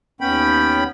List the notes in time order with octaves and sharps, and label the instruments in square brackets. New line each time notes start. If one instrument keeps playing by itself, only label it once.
[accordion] D#2 B3 C#4 G5 B5